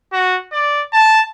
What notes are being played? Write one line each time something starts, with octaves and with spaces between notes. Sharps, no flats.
F#4
D5
A5